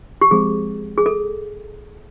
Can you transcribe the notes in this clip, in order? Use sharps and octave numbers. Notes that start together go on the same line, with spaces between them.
G4
F3 G#3 C4 G#4
G#4
A4